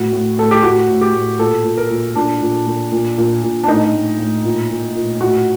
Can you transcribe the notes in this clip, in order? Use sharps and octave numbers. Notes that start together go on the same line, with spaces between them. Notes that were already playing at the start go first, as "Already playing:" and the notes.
Already playing: A2 F#4
A2
A2 A4
G4
A2 F#4
A2
G4
A2
A#2 A4
A#2
A#4
A#2
A#2 D4
A#2
A#2
A#2
A#2
A#2
D4
A2 D#4
A2
A2
A#2
A#2
A#2
A2 F#4